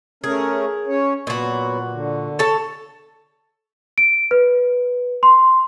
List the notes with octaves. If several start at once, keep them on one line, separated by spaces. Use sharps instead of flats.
A3 C#4 G#4 A#4
C#4 C#5
A#2 F#3 B3 F#4
D3
A4 C#5 A5
D7
B4
C6